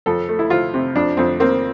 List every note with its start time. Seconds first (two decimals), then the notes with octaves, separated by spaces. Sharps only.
0.06 F2 A4
0.29 A3
0.39 E4
0.50 F3 F4
0.74 C3
0.95 F2 D4
1.17 F2 C4
1.40 A#3 C4